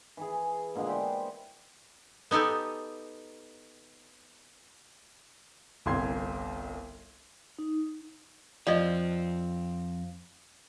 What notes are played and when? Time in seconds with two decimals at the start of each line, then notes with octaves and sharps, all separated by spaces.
0.17 E3 E4 G#4
0.75 A#2 D3 G#3 B3
0.87 E4 G4 C5
2.31 B3 D#4 G4 A4 G#5
5.86 G1 C2 C6 G#6
7.59 D#4
8.67 F2 F3 C4 D5 D#5